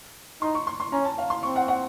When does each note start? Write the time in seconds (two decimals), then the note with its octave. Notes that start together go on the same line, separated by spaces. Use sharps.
0.42 D#4 C6
0.55 C#6
0.67 C6
0.80 C6
0.92 C#4 A#5
1.05 A5
1.18 F5
1.30 C6
1.43 C4 C#6
1.56 F#5
1.68 F#5